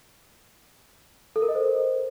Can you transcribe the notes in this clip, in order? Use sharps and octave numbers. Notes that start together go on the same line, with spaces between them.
A4
A#4
D#5
C5